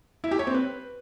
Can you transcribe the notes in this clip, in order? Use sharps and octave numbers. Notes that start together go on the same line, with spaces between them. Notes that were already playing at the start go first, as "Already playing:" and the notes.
E4
G4
C#5
C4
B4